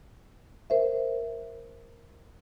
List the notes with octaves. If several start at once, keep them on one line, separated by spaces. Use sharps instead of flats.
A#4 C5 E5